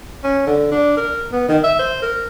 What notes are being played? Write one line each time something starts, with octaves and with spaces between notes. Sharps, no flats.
C#4
D3
D4
A#4
B3
D#3
E5
C5
A#4